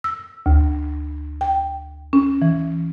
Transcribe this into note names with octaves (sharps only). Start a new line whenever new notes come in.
E6
D2
G5
C#4
E3